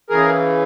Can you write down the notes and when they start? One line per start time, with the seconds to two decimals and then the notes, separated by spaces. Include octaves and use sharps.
0.09 C#3 E3 G#4 A#4